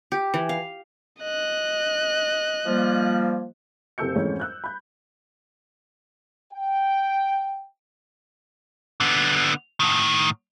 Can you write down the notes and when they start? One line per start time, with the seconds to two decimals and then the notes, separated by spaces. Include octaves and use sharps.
0.12 G4
0.34 E3
0.49 F5
1.21 D#5 F#6
2.66 F3 G3 A#3
3.98 F#1 C3 A4 E6 G6 C#7
4.15 F2 G#2 E3 G#3 A3 C#4
4.40 E6 F#6 G6
4.64 B5 G6
6.52 G5
9.00 D3 B3
9.80 A2 D#3